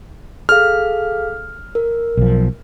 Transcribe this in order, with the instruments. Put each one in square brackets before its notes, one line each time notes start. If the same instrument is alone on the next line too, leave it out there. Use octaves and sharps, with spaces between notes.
[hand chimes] G#4 A4 F5 [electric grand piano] F6
[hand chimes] A#4
[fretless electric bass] B1 F3